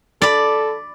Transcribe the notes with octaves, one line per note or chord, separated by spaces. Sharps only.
A4 D5 B5